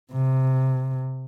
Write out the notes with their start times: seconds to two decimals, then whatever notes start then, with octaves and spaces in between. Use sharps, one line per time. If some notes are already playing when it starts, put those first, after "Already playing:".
0.12 C3